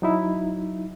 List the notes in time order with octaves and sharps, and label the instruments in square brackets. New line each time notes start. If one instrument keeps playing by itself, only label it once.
[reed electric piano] F#3 D#4 E4